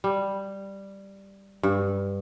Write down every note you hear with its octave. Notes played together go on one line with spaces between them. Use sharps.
G3
G2